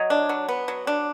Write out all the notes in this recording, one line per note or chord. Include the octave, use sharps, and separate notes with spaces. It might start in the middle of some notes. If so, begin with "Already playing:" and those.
Already playing: F#3 C#5 D#5
D4
F#3
B3
F#3
D4